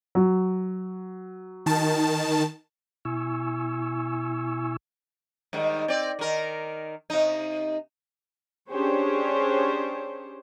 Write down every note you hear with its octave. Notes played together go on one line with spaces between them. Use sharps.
F#3
D#3 A5
B2 E4 G#5 C#6 E6
G#2 D#3 G3
C4 D5
D#3 A#4
C3 D#4
C#4 D4 G4 G#4 C5 C#5